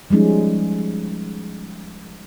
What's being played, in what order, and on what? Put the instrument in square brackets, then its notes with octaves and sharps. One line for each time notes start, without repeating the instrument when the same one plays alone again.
[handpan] F3 G3 G#3 C#4 D#4